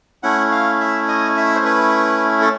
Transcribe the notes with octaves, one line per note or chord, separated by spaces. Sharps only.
A3 C#4 E4 F#5
F5
E5
D#5
E5
C5
B4
A4